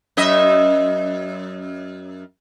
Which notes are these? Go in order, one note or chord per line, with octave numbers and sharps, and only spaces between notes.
F#2 D#5 E5